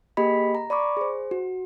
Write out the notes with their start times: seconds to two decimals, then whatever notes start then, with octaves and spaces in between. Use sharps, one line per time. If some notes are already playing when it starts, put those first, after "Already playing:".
0.17 A#3 G4 G#4 D#5 B5 B6
0.55 A#5
0.70 D5 B5 C#6 D6
0.97 G#4 C5
1.31 F#4